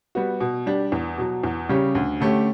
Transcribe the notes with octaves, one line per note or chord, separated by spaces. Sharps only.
G3 B3 F#4
B2
G3 D4 G4
E2
B2 F#3
E2
C#3 G3 C#4 G4
D2
D3 A3 C#4 G4